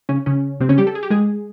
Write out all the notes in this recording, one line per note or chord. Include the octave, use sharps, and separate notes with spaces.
C#3 C#4
C#3 C#4
C3 C4
C#3 C#4
G3 G4
A4
G#4
G4
G#3 G#4